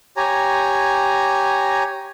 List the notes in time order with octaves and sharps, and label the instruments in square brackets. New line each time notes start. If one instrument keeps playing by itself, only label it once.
[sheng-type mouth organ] G4 C#5 G#5 A#5